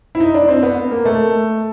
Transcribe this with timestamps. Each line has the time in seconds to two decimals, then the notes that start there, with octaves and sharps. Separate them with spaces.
0.15 E4
0.20 D#4
0.34 D4
0.48 C4
0.63 B3
0.91 A#3
1.05 A3